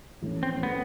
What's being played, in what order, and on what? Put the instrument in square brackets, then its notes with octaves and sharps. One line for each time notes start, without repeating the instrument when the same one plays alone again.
[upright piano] A#1 A2 E3 A3 C#4
[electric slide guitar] C4
[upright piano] A2 E3 A3 C#4 [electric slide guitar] B3